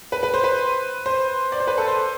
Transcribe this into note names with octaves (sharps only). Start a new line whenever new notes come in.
B4
B4
C5
B4
C5
D5
C5
B4
A4
C5